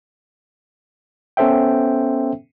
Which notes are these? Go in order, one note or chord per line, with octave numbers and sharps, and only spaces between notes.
B3 C#4 A4 C5 E5 G5